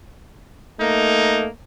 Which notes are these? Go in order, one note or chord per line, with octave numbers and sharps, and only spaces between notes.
A3 A#3 D#4